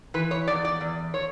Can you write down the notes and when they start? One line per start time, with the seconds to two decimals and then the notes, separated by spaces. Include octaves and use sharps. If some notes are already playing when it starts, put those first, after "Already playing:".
0.14 E3 B4
0.31 C#5
0.47 E2 D5
0.65 D5
0.81 E2
1.14 C#5